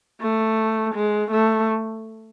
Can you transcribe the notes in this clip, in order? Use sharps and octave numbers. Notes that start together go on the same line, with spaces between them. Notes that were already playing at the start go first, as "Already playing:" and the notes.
A3
G#3
A3